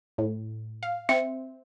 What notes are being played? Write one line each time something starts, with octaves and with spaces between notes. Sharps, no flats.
A2
F5
C4 E5